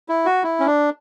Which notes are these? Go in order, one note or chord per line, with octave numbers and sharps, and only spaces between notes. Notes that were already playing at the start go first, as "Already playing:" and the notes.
E4
F#4
E4
C#4
D4